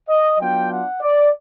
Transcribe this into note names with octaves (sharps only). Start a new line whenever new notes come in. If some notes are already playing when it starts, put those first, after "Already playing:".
D#5
F#3 B3 D4 F4 G5
F#5
D5